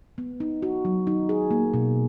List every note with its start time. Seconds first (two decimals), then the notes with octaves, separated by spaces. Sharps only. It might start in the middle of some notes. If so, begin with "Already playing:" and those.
0.18 B3
0.40 D#4
0.62 F#4
0.85 F#3
1.07 D#4
1.29 G#4
1.51 A#3
1.74 B2